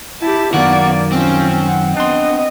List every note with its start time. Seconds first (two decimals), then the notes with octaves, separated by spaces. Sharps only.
0.21 E4 G4 A5
0.54 F#2 D#3 A#3 B3 F#4 D5
1.12 F3 C4 C#4
1.66 F#5
1.97 B3 D4 D#5 C6